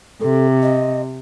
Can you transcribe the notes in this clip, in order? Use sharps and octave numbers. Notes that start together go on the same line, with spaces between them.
C3 A4
D#5